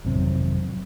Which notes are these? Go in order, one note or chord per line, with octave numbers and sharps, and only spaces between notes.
G#1 F2 C3 F#3